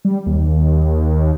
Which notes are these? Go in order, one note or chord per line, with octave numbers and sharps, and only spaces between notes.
G3
D#2